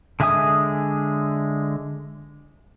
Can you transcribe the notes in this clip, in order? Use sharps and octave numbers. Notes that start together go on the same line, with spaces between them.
D3 G#3 E5 G#5 D#6